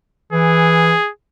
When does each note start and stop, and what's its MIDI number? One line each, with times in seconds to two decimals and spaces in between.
0.33 0.94 52
0.33 1.10 68